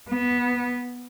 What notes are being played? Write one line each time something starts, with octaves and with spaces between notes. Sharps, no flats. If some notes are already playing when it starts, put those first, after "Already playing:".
B3